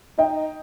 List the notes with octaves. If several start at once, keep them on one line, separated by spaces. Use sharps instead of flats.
D#4 D#5 G5